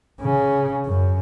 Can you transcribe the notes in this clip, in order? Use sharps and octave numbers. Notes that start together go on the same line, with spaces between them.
C#3
F#2